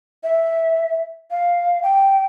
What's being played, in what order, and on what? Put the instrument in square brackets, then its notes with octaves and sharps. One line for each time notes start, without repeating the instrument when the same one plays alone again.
[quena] E5
F5
G5